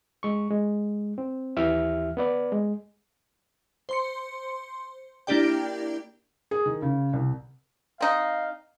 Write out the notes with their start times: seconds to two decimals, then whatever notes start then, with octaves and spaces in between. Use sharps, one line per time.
0.23 G#3 C#6
0.50 G#3
1.18 C4
1.57 D#2 E3 G4 E5 F6
2.17 B3 B4 D5
2.52 G#3
3.89 C5 C6 C#7
5.27 A#3 D4 E4 G4 D5 G5
6.51 G#4
6.66 D#3
6.82 C#3
7.13 C2
8.01 C4 D#4 F5